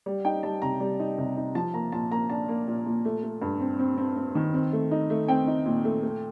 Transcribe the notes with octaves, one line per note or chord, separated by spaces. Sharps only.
G3
D#4 G5
G3 A5
C3 A#5
G3
D#4
C3
D#4
F3 A5
A#3 A#5
A#2 A5
A#3 A#5
D4 A5
A#3
A#2
A#2
A3
A3
G2
C4
C4
C4
C4
D#3
C4
A3
D#4
A3
C4 G5
D#4
A#2
A3
A3